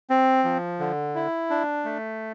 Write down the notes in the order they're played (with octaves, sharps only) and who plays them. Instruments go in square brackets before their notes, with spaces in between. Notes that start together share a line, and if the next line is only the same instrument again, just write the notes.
[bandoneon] C4
F3
D3
E4
D4
A3